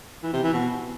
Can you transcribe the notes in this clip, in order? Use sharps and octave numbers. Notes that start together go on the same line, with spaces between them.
E3
C3
E3
B2